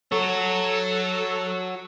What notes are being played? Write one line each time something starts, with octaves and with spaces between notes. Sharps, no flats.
F#4 A4 C#5